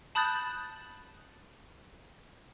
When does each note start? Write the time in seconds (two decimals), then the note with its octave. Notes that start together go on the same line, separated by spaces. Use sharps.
0.15 A5 B5 D#6 F#6 G6 A6